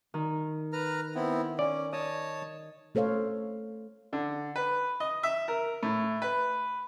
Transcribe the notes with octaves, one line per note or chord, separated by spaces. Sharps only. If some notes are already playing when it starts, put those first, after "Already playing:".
D#3
B4 A#5 F6
B3 C4 E4
C#4 D5
C#5 D#5 A5
A3 A4 C5 C#5 F5
D3
B4
D#5
E5
A#4
A2
B4